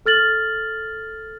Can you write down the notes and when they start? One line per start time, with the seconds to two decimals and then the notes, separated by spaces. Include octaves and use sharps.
0.06 A4 F6 A6 F#7